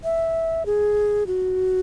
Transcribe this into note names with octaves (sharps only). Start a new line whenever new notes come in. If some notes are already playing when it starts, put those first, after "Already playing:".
E5
G#4
F#4